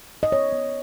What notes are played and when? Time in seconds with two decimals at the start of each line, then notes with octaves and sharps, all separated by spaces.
0.23 D#5
0.32 B3 C#5
0.53 B3